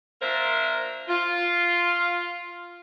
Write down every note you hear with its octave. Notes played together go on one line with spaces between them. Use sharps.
A#3 D4 F4 A#4 C5 E5
F4